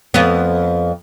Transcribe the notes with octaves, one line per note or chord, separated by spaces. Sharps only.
F2 B3